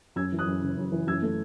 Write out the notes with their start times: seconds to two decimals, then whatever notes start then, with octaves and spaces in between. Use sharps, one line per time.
0.16 F#2 E6 G#6
0.32 E3
0.39 D#6 F#6
0.46 F#2
0.62 C#3
0.77 F#2
0.92 E3
1.07 F#2 E6 G#6
1.23 A3